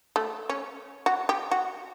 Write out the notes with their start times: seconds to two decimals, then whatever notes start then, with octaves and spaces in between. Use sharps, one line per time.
0.16 A3
0.50 C#4
1.06 F#4
1.29 G4
1.51 F#4